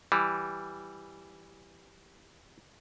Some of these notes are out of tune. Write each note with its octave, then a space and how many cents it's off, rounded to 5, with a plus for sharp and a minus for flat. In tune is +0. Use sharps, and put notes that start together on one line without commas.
E3 +0 G3 +0